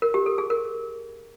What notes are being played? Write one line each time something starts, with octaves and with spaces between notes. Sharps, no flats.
A#4
G4
A4
G#4
A#4